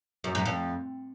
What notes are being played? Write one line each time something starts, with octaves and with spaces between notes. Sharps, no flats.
F#2
F#2
F2